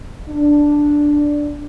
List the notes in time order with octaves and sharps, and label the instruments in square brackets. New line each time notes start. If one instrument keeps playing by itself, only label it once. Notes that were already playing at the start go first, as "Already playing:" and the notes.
[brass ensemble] D4